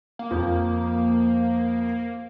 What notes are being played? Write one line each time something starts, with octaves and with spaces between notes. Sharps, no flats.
A#3
F2 F3